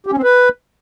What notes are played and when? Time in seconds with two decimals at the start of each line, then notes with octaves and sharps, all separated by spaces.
0.06 G4
0.12 C#4
0.18 C4
0.23 B4